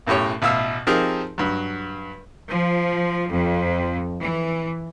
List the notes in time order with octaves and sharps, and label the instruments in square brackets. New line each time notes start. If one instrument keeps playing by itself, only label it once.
[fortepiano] B1 F#2 A2 G4 C#5
A1 B2 E5 F5 E6
F3 C4 D#4 G4 G#4 A#4
G2 F#3
[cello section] F3
F2
E3